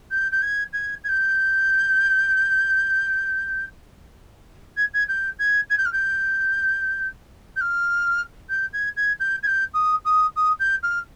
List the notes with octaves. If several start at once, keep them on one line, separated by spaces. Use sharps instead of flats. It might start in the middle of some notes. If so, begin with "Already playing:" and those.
G6
G6
G#6
G#6
G#6
G6
G#6
G#6
G6
G#6
G#6
G6
F6
G6
G6
F6
G6
G#6
G#6
G6
G#6
G6
D#6
D#6
D#6
G6
F6